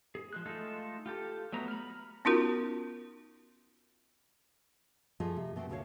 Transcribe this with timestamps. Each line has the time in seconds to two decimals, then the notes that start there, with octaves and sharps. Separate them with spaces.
0.15 G#4
0.33 F3 G#3 F#6
0.45 G#3 A3 D#4 F4 A4
1.06 F4 G4 A4
1.52 F#3 A3 B3 A#5
1.68 B5 F6
2.25 B3 C#4 D#4 F4 F#4 A#4
5.20 F3 A3 F4 G#4 D#5
5.36 C3
5.56 B2 A3 C4
5.69 D2 D3 A4 A#4 C#5 F5